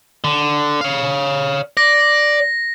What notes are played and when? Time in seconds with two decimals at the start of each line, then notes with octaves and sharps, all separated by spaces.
0.24 D3
0.81 C#5 F5
1.77 D5 A#6